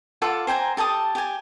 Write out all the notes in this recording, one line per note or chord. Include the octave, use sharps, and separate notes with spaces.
F4 A4 F#5 D6
C5 G5 G#5 A#5
G4 A4 A5 D#6
G4 G#5